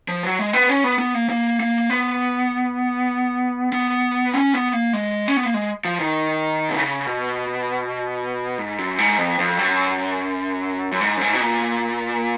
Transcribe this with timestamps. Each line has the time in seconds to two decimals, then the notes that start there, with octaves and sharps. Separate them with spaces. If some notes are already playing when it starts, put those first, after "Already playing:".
0.08 F3
0.23 F#3
0.39 G#3
0.53 B3
0.69 C#4
0.84 B3
0.99 B3
1.14 A#3
1.30 A#3
1.60 A#3
1.90 B3
3.72 B3
4.33 C#4
4.54 B3
4.73 A#3
4.93 G#3
5.28 C#4
5.37 B3
5.45 A#3
5.54 G#3
5.85 F3
6.00 D#3
6.69 B2
6.75 C#3
7.06 B2
8.58 G#2
8.78 F#2
8.98 G#2
9.18 F2
9.39 F2
9.59 F#2
10.92 F#2
11.01 G#2
11.16 F#2
11.21 G#2
11.33 B2
11.41 A#2